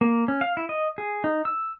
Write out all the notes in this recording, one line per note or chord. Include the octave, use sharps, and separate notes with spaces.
A#3
C#4
F5
E4
D#5
G#4
D#4
E6